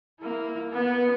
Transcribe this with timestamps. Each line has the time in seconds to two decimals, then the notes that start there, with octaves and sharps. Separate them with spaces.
0.20 A#3 E4
0.72 B3